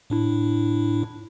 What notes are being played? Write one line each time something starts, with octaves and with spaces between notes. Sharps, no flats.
A2 D4 E4